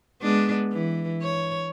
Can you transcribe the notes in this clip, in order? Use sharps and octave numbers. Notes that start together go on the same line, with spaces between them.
G#3 B3 D4
E3
C#5